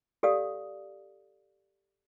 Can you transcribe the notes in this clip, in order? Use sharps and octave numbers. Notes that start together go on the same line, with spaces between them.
G4 A4 D5 F5 D#6